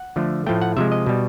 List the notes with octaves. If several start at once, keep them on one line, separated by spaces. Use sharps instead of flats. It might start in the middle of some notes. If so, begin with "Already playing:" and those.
Already playing: F#5
D3 F3 A3
A2 F3 A3 G5
F#5
C3 F3 G#3 E5
D#5
B2 G3